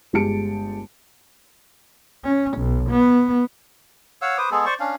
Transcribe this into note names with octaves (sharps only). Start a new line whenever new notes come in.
G1 G#3 G4 A5 C#7 D7
C#4
B1
B3
C#5 F5 F#5 E6
B4 C5 D6 D#6
G#3 B3 G#4 A4
C5 D5 C#6
C#4 D4 F5